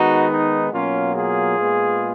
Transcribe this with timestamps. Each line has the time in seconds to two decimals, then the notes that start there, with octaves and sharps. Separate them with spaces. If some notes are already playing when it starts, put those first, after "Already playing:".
Already playing: D#3 G#3 B3 D#4 F#4
0.31 D#4
0.73 B2 F#3 A#3 C#4 F4
1.15 F4 G#4
1.57 A#2 G#3 B3